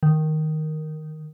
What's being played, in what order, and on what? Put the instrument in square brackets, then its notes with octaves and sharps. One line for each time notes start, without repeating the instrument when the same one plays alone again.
[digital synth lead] D#3